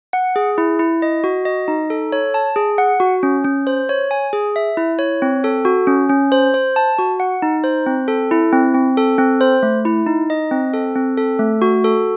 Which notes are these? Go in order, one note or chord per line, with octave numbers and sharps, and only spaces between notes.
F#5
G#4
E4
E4
D#5
F#4
D#5
D#4
A4
C#5
A5
G#4
F#5
F#4
C#4
C#4
C5
C#5
G#5
G#4
E5
E4
C#5
C4
A4
F#4
C#4
C#4
C5
C5
A5
F#4
F#5
D#4
C5
C4
A4
E4
C4
C4
A4
C4
C5
A3
E4
D#4
D#5
C4
A4
C4
A4
A3
F#4
A4